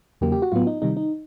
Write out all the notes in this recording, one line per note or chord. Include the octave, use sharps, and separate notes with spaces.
E2 C#3 F#3 A#3 G4
G4
F#4
A2 F#3 B3 F4
D#4
C3 D#3 G3 D#4
D#4